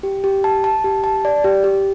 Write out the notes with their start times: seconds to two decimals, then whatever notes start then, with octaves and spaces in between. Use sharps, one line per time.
0.03 G4
0.24 G4
0.44 A5
0.64 A5
0.84 G4
1.04 A5
1.25 D5
1.44 G4
1.64 G4